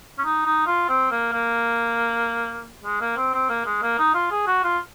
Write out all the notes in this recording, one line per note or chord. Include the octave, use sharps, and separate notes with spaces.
C#4
D#4
D#4
F4
C4
A#3
A#3
G#3
A#3
C4
C4
A#3
G#3
A#3
D#4
F4
G#4
F#4
F4